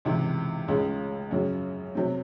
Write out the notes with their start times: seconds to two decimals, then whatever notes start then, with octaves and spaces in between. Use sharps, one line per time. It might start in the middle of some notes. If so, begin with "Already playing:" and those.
0.05 C#2 C3 E3
0.68 C#2 C#3 G#3
1.31 F#2 C#3 F#3
1.95 C3 F#3 C4